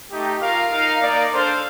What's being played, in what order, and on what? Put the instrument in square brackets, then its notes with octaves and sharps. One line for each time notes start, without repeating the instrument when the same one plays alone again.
[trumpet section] A3 D#4 G4
F4 A#4 F5
D#4 A#4 F5
A#3 D#4 A#4 D5
D4 A4 C5 F5